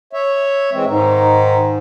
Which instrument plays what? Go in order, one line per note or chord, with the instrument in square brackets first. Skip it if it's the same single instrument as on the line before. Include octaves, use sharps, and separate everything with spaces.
[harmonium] C#5 E5
E3 G#3 C4
[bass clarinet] G#2 [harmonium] D#3 D#4